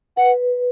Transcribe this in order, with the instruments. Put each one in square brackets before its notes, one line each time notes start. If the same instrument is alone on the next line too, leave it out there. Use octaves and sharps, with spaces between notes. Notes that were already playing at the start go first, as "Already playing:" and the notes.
[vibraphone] B4 [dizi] F#5